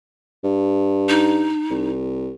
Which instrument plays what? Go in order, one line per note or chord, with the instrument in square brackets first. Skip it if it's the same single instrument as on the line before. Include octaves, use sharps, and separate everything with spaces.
[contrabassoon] G2
[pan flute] D#4
[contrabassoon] C2